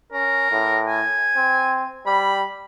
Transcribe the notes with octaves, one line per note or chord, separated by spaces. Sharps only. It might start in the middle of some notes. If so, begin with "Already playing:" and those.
C#4 A#4
A2
G#5
C4
G3 B5